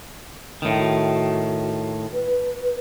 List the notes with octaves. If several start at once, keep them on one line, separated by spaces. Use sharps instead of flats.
A2 D#3
F#4
B4